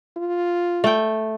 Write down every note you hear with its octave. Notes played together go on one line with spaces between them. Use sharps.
F4
A3 G5